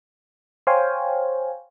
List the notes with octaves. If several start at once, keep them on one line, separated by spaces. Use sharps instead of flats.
C5 C#5 F5 G5 G#5